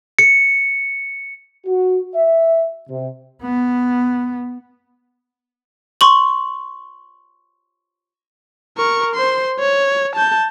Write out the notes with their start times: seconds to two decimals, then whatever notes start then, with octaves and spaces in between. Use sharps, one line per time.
0.19 C#7
1.66 F#4
2.15 E5
2.90 C3
3.42 B3
6.01 C6 C#6 F#7
8.78 A#4 C#6
9.15 C5 C6
9.60 C#5
10.16 A5 G6